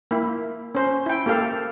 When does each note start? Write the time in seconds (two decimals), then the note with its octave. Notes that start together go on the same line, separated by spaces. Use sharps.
0.11 A#3 E4
0.75 C#4 C5
1.06 E4 G5
1.26 A#3 G4 A4 F5